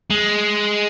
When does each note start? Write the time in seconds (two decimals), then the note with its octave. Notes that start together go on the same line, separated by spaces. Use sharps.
0.10 G#3